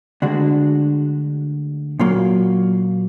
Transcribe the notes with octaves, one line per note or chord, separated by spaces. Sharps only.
D2 D3 G#3 D4 F#4
A#2 F#3 A#3 F4